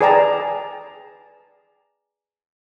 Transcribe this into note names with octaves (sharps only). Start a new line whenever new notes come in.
G#4 B4 D5 G5 A5 A#5